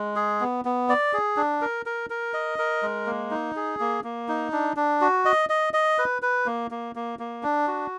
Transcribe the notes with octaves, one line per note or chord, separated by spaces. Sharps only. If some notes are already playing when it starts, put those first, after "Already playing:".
Already playing: G#3
G#4
B3
B3
D5
G#4
D4
A#4
A#4
A#4
D#5
A#4
G#3
A#3
D#4
G#4
A#3
A#3
D#4
D4
D4
F#4
D#5
D#5
D#5
B4
B4
A#3
A#3
A#3
A#3
D4
F#4